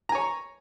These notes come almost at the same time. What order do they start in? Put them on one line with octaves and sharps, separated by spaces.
A#5 G#5 C#5